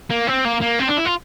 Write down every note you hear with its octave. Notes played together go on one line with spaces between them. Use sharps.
A#3
C4
A#3
A#3
C4
D4
E4
F4